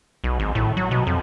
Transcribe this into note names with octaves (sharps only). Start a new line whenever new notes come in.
B1
G#1
A2
F#3
B2
F2